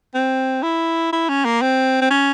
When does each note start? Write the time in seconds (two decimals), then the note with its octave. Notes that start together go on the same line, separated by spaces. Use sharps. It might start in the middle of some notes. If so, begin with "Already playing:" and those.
0.14 C4
0.62 E4
1.13 E4
1.29 C#4
1.45 A#3
1.62 C4
2.01 C4
2.10 C#4